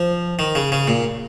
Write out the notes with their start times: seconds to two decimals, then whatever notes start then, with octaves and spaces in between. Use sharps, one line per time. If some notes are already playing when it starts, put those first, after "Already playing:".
Already playing: F3
0.39 D#3
0.55 C#3
0.72 C#3
0.88 A#2